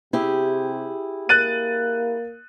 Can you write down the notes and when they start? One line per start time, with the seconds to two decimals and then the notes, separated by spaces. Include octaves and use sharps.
0.13 C3 E4 G4 G#4
1.29 A#3 F#6 A6 D#7